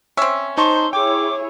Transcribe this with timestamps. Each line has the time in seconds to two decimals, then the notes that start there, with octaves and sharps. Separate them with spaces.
0.17 C4 C#4 E5 E6
0.57 D#4 C5 A5 C6 C#6
0.93 E4 G#4 C#5 G5 D6